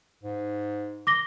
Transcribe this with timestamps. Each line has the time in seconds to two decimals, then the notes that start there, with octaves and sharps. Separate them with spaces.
0.23 G#2
1.07 D6 A#6 G7